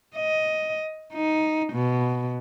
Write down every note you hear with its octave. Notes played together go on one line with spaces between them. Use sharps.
D#5
D#4
B2